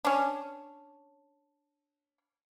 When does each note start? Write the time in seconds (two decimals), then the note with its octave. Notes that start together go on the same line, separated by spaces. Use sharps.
0.05 C#4 D4